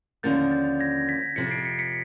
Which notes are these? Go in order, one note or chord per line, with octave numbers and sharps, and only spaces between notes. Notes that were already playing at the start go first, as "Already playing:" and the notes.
D#2 D3 F3 A#3 C#4 G6 A6
G6 A6
G#6 A#6
A6 B6
F2 C3 F3 B6 C#7
C7 D7
B6 C#7
B6 C#7